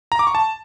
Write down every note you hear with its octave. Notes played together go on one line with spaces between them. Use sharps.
A#5
D6
C#6
A5